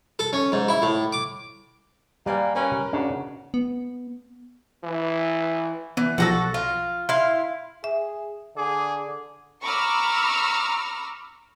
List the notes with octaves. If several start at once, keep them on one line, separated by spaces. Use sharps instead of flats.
A4
C#4
G#2
E4
A2
D6
G3 A#3 B4 D5 G#5
C#4 A#4 B4 A#5
C#3 D4 F#4
B3
E3
E3 B3
B1 F3 F#4 G4 A4 A#6
F4
E4 F5 C6
G#4 E5
D3 G#4 D6
A#5 B5 C#6 D6 E6 F6